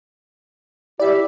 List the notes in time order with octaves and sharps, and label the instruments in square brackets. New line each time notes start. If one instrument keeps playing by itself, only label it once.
[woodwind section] E4 G4 E5 [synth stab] D5